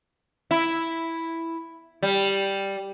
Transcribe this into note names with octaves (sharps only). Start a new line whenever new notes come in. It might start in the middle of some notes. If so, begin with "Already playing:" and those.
E4
G3